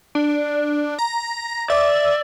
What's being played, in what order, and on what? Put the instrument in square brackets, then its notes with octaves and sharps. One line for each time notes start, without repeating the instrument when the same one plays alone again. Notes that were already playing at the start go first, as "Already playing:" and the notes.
[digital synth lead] D4
A#5
[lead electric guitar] D5 [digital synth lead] E5